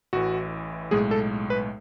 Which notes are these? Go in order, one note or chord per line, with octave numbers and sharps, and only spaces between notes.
A1 A2 E3 F#4
B1 A2 G#3 G#4
A4
B4